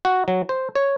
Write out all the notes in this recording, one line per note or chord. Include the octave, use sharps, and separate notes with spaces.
F#4
F#3
C5
C#5